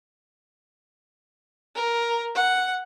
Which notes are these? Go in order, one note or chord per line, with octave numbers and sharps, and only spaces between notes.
A#4
F#5